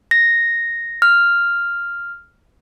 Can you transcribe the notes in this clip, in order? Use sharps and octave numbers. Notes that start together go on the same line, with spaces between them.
A#6
F6